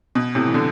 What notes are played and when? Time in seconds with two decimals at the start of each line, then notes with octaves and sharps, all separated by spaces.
0.15 B2
0.35 A2 C3
0.47 E3
0.54 B2 D3